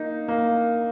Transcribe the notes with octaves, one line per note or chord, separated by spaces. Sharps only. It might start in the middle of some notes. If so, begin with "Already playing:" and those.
Already playing: A#3 D#4
A#3